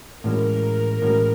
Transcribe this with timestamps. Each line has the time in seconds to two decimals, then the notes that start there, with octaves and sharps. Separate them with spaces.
0.24 A2 E3 G#3 C#4 F#4 A#4
1.02 A2 E3 G#3 C#4 F#4